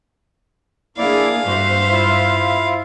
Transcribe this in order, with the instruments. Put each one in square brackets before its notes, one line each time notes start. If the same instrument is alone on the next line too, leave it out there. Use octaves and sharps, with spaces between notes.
[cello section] A#3 D4 G#4 [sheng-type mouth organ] E4 D5 [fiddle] F5
[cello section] G2 C5 E5 [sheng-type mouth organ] F#4
[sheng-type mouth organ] E4 F4